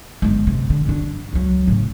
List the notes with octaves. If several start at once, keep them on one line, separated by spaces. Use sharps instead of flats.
G1 G#3
C3
D3
G2 D4
C#2 F#3
A2 C#3